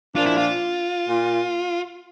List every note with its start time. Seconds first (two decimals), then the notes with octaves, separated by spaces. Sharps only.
0.16 A#2 F3 A#3 D4 F4
0.26 E4
0.38 F4
1.06 A#2